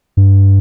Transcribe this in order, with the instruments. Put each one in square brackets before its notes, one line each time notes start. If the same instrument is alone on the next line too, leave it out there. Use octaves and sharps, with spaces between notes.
[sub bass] G2